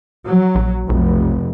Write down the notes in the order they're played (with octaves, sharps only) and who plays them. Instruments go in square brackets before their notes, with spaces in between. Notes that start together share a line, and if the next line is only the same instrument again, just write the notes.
[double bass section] F#3
[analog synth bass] A#1
[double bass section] F1 [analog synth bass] B1